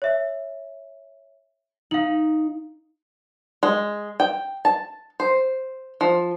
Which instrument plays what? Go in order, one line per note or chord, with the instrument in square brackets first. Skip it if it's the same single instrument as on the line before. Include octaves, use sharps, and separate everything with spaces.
[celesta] C#5 E5
[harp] D#4 [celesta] F5 F#7
[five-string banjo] G#3
G5
A5
C5
F3